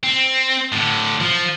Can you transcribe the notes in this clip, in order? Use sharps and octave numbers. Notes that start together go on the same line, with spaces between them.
C4
A2 D3
F3